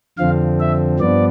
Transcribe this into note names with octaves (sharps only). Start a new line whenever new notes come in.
F2 D3 F3 C4 F5
E5
G2 F3 B3 D5